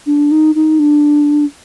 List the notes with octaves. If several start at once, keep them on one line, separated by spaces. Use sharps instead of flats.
D4
D#4
D#4
D4